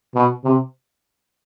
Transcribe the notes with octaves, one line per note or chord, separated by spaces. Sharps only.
B2
C3